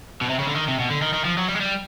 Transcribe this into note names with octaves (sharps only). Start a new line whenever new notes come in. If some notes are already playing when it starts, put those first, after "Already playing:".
B2
C3
C#3
D3
D#3
C3
B2
D3
D#3
D#3
F3
F#3
G3
G#3
G3